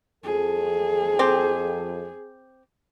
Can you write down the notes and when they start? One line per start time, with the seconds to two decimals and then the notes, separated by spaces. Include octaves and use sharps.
0.24 F2 G#4 A4
1.19 C4 G4